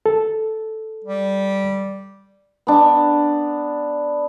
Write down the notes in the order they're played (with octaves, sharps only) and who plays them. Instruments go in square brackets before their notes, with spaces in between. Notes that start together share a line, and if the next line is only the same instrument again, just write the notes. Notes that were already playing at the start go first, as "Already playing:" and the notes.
[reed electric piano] A4
[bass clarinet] G3
[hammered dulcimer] B3 D4